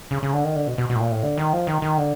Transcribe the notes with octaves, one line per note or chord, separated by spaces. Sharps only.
C#3
C#3
D3
D#3
D3
B2
B2
B2
A2
A#2
A2
D3
D#3
F3
D#3
D#3
D3